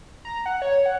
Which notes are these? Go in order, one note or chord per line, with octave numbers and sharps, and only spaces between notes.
A#5
F#5
C#5
F#5